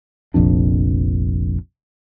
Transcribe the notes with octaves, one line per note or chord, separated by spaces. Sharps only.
F1 A#1 F2 D4